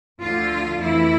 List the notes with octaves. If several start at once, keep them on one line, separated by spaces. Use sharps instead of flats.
D2 D3 F3 A3 F4
F2 E3 A3 E4